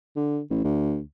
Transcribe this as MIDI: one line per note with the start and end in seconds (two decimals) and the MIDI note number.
0.16 0.40 50
0.50 0.61 33
0.64 1.01 38